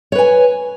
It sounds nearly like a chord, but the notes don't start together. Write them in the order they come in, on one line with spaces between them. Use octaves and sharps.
C#5 B4 G#5